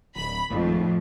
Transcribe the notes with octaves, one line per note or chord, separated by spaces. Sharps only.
D1 B5
G#1 F2 A2